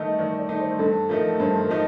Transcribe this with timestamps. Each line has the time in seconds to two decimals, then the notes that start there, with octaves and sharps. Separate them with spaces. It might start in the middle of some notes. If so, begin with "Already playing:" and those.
Already playing: D#3 A3 D#4 D#5
0.19 D#3 D5
0.39 D5
0.49 A3 D#4
0.60 C5
0.79 G2 A4
1.09 F3 A3 D#4 A#4
1.40 G2 C5
1.60 A#4
1.70 F3 A3 D#4